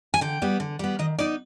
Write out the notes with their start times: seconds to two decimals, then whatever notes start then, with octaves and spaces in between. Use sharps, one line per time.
0.14 G#5
0.21 D3 G5
0.42 G3 B3
0.60 D3
0.79 G3 B3
0.99 D#3 D#5
1.18 B3 D#4 D5